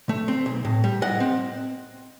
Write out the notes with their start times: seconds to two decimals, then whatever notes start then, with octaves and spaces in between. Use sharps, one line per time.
0.09 A3
0.28 C4
0.46 B1
0.65 A2
0.84 G3
1.02 A2 D#5 F#5
1.20 C4